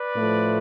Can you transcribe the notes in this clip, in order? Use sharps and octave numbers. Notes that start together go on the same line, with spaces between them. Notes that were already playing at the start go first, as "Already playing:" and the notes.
Already playing: B4 D5
A2 F3 A3